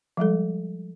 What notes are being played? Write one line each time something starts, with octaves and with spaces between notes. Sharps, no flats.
F3 G3 G#3 A4